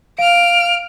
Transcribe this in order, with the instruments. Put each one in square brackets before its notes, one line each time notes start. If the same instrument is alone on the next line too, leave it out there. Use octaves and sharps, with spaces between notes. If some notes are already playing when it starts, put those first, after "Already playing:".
[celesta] F5 [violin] F6 D7